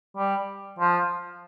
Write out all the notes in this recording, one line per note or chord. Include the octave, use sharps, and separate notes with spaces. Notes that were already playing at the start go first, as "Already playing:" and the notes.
G3
F3